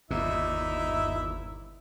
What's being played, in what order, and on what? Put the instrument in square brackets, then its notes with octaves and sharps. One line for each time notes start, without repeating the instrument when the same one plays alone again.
[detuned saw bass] G1 [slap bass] D#2 A#2 [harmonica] D#4 E4 E5